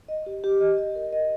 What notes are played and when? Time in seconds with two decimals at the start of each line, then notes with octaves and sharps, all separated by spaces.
0.08 D#5
0.26 G4
0.44 G4
0.61 D#5
0.78 D#5
0.95 A#4
1.13 D#5